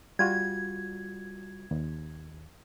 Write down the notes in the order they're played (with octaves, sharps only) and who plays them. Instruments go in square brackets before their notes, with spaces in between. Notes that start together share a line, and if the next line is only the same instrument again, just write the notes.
[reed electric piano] G3 F4 F#4 [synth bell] G#6
[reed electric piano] D#2